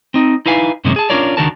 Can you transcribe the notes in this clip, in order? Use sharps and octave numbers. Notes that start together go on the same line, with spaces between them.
C4 D#4
D#4 E4 B4 F5 G#5
F#2 C3 D#3 G#3 A#3 C#4
G#4 A5
C#4 D4 F4 A#4 C#5 D5
C#2 D#3 D4 F#4 A#4 A5